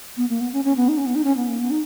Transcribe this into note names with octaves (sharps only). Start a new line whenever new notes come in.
B3
A#3
B3
C#4
C#4
B3
D#4
C#4
B3
D#4
C#4
B3
A#3
B3
D#4